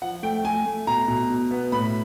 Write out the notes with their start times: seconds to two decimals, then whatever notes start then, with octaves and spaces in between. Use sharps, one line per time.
0.02 F3 F#5
0.23 A3 G5
0.44 A3 G#5
0.66 A3
0.87 B2 A#5
1.08 B2
1.30 B2
1.51 B3
1.72 A2 B5